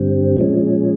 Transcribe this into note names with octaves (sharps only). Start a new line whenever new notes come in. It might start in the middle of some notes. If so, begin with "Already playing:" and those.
Already playing: G2 D3 G3 C4
A#2 F3 G#3 C#4